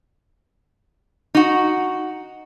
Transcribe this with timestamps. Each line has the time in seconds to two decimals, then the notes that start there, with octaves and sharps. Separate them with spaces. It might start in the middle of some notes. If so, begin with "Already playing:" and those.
1.35 D#4 F#4